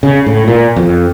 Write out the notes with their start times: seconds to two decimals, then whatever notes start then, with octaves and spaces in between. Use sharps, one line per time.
0.03 C#3
0.26 A2
0.48 A#2
0.76 F2